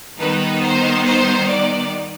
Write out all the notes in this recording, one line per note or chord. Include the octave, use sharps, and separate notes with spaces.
D#3 G3 B3 D#4 B4
C5
C5
D5